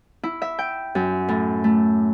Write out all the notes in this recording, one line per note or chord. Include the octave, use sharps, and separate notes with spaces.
E4
E5
G5
F#2
A2
A3